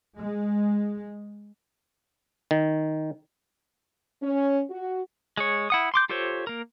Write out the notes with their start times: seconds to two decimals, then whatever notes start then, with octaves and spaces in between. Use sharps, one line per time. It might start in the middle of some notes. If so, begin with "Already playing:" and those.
0.18 G#3
2.51 D#3
4.22 C#4
4.70 F#4
5.37 G#3 G#4 C#5
5.70 E4 F#5 D#6
5.94 C6 D6 G6
6.09 F4 G4 A4 C5 C#5
6.47 A#3 A#4